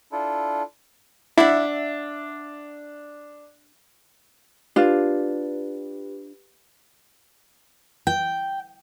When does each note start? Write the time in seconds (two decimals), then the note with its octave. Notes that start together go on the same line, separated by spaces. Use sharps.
0.12 D4 E4 F4 A4
1.38 D4 E4 E5 F#5
4.76 D4 F4 G4 B4
8.07 G5